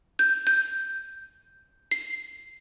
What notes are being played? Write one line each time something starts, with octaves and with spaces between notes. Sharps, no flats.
G6
G6
C7